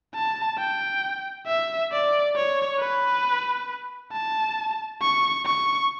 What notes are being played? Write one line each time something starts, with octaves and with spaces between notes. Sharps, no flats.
A5
G5
E5
D5
C#5
B4
A5
C#6
C#6